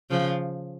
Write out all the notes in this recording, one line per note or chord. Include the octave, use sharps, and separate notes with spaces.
C#3 F3